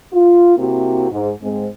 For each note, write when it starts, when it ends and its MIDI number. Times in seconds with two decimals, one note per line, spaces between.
0.13 0.56 65
0.57 1.10 48
0.57 1.10 58
0.57 1.10 60
0.57 1.10 64
0.57 1.10 66
1.11 1.31 44
1.42 1.68 44
1.42 1.68 56
1.42 1.68 60